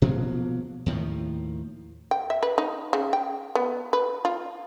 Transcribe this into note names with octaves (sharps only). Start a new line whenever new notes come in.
B2 F3 F#3 A#3
D#2 A2 D#3 F3
G5
E5
B4
D#4
C#3
G5
B3
B4
F4